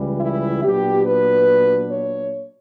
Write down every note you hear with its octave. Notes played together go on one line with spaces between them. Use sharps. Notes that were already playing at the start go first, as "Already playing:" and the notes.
Already playing: C#2 C#3 E3 G3
E4
A#2 F#3 B3 D4 G4
B4
C#5